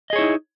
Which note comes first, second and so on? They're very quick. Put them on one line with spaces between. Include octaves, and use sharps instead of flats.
D#5 G#4 C#5 E4 D#4